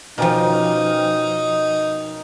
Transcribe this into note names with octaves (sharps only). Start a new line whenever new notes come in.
B2 F3 A#3 C#4 D#4 G5